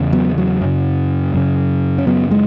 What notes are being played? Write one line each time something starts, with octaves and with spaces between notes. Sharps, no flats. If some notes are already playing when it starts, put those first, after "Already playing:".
Already playing: E2 C#3
F#3 B3
F#3
F#2 C#3
F#2 C#3
C#4
F#2 C#3 F#3 B3
G#3